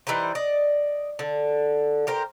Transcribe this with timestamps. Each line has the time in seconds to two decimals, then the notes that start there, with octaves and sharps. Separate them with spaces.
0.07 E3 G3 D#4 C5
0.35 D5 D#5
1.19 D3
2.07 G4 A#4 C5